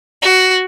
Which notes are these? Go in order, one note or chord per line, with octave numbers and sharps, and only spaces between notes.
F#4